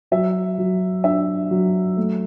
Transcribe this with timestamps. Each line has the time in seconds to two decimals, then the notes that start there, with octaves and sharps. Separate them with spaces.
0.11 F#3 E5
0.58 F#3
1.04 D4 E5
1.51 F#3
1.97 A3